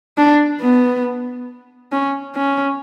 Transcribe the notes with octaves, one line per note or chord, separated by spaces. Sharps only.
D4
B3
C#4
C#4